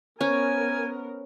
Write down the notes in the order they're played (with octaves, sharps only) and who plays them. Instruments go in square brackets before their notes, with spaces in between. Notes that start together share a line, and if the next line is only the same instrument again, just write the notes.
[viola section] B3 A#4 [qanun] C#4 [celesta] C5 C#5 [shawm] G#5